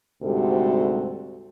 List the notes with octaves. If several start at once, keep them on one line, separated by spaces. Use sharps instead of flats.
D2 G#2 C3 G3 F#4 A4